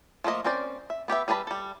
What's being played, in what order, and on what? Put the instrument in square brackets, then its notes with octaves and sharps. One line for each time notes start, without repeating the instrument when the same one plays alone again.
[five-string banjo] F3 A3 A#3 D#5
C4 C#4 A#4 C5 D5
E5
B3 G4 B4 E5
G3 G#4 B4 A5 B5
G3 A4